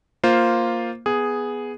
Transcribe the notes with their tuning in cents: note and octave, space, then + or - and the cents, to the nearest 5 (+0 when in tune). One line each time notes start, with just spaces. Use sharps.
A#3 +0 F4 +0 C5 +0
B3 +0 G#4 +0